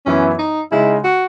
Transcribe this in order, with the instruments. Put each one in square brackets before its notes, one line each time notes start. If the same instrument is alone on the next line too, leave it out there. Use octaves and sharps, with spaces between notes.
[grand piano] F#2 E3 B3 E4 [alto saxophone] C#4
[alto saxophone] D#4
[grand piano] C#3 G#3 D#4 [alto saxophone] E4
[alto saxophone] F#4